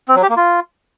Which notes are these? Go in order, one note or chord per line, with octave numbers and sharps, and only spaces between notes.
C4
F#3
G4
A#3
F4